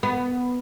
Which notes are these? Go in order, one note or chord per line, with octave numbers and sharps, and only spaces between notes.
B3